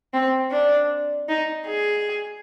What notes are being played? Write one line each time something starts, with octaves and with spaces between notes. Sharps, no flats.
C4
D4
D#4
G#4